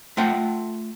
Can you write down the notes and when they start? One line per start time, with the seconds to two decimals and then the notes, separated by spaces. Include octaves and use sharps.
0.17 A3 F4 F#5 G5